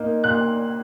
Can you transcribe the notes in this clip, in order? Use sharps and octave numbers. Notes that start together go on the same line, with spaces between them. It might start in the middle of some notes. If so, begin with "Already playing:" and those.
Already playing: A#2 A#3 D#4
A#2 F#6